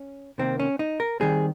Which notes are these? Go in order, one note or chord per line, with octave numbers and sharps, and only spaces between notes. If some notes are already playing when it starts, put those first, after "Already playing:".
Already playing: C#4
C3 D#3 A#3 C4
C#4
D#4
A#4
D#3 G3 C4 G#4